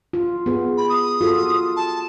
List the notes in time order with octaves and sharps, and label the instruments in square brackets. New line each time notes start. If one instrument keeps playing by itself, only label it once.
[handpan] F4
B3 G#4
[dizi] B5
D#6
[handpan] F4 F#4 A4
[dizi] A5